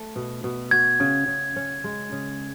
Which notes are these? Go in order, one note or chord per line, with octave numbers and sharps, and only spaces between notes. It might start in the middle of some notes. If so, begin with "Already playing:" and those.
Already playing: A3
B2
B2
F#4 G#6
C#3
C#3
C#4
G#3
C#3